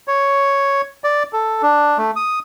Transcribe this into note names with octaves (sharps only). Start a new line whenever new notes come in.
C#5
D5
A4
D4
A3
D#6